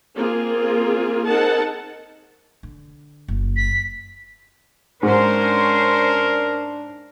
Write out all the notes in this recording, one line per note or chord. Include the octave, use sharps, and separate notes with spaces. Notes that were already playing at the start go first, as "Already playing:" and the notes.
A#3 C4 F4 G#4 A#4
C4 D#4 G#4 A#4 F#5 A5
D3
F#1
B6
G#2 C#4 D4 A#4 C5